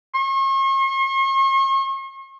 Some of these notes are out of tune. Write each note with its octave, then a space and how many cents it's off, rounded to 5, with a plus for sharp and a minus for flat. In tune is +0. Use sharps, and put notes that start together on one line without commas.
C#6 -45